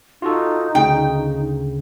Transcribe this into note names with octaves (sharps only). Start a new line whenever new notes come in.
D#4 F4 F#4 A4
D2 C#3 G5